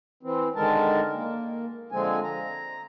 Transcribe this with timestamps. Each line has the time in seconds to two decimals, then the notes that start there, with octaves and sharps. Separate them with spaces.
0.23 E3 C4
0.56 D3 D#3 G#3 A#4 A5
1.13 A#3
1.92 D3 F3 G#3 C4 G#5
2.23 A#5